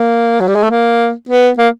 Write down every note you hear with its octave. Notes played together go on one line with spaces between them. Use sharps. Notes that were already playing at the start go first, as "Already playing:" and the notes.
Already playing: A#3
F#3
G3
G#3
A3
A#3
B3
A#3